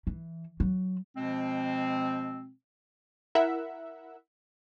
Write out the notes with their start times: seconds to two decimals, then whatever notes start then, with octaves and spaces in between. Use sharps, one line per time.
0.07 E3
0.60 F#3
1.17 B2 F3 G#3 C4
3.35 E4 A#4 E5 F#5